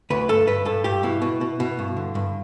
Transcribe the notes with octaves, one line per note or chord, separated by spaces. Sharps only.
D2 B4
G2 A4
G2 B4
G2 A4
G2 G4
B2 E4
B2
B2
B2
G2
D3
G2